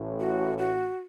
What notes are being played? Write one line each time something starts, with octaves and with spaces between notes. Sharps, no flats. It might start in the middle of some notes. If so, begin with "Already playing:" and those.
Already playing: A1 A2
F#4
F#4